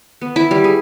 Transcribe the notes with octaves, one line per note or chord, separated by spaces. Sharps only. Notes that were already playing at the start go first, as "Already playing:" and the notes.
B3
E4
G3
G#4